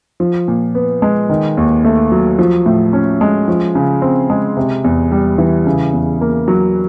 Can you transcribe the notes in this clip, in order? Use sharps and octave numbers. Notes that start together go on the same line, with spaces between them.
F3
A#2
B3
G#3
D#3
D#2
A3
F#3
F3
A2
C#4
G#3
F3
C#3
C4
G#3
C3
E2
G3
E3
C#3
E2
A#3
F#3